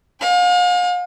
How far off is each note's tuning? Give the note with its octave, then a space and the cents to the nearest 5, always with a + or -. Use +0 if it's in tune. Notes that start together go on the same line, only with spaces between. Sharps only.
F5 +40 G#5 -35